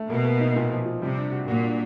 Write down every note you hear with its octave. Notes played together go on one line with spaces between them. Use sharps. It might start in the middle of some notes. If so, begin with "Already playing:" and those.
Already playing: A3
B2 A#3
A#3
D#4
A#2
F3
F3
C3 G3
D4
F#4
A#2 F#4
D4